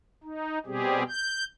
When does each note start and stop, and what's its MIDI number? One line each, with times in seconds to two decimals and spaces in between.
0.23 0.59 63
0.66 1.03 47
0.66 1.03 55
0.66 1.03 60
0.66 1.03 67
0.66 1.03 68
1.09 1.44 91